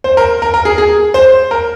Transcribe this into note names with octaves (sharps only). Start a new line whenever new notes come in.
C5
A#4
A#4
A#4
G#4
G#4
C5
A#4